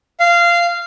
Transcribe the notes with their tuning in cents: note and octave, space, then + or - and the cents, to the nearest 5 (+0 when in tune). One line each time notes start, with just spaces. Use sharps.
F5 -15